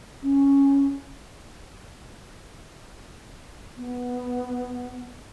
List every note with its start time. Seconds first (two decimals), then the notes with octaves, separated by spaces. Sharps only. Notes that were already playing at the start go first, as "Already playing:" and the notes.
0.23 C#4
3.77 B3